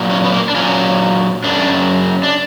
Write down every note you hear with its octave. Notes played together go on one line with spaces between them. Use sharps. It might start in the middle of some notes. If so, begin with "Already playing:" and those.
Already playing: A#2 F#3
C#4
B3
A#3
D4
A#2 F#3 C#4
F#2 C#3 F#3 D4
D4